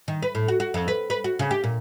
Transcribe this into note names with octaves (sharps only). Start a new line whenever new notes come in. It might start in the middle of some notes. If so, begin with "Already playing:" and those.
D#3
B4
A2
F#4
F#4
F2
B4
B4
F#4
C#3
G4
A#2